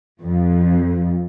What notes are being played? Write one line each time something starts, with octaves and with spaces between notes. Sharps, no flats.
F2